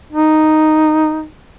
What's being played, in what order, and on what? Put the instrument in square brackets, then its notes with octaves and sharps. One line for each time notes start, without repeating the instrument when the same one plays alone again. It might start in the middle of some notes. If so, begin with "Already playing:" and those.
[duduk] D#4